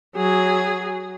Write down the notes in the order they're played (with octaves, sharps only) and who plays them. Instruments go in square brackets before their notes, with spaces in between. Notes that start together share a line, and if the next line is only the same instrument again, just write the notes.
[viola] F#3 G#4